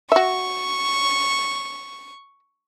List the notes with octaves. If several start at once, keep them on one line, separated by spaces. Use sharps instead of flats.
F#4 E5 C#6